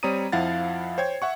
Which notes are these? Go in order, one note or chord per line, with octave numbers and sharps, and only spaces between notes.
G3 C4 C#5 A#5 D#6 D#7
F2 F3 E4 F5 F#5 A6
C5 C#5 G5 G#6
E5 F#5 C#6